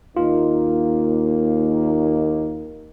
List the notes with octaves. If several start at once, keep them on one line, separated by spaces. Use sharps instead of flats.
D#2 A#3 D#4 F4